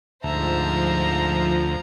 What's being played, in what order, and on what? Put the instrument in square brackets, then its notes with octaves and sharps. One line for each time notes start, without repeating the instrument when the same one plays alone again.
[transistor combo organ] D2 [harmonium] G#2 E5 A5 [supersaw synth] F3 [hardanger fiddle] C5 A#5